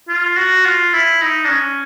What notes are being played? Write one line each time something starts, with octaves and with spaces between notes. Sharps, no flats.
F4
F#4
F4
E4
D#4
D4
C#4